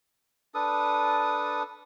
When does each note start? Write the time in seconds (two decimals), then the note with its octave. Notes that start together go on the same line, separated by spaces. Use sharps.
0.54 D4 A4 B4 D#6